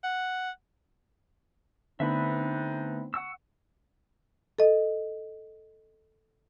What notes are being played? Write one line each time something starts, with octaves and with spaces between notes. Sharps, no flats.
F#5
D3 A3 B3 C4 D4 D#4 E5 B5
F#5 C#6 E6
A4 D#5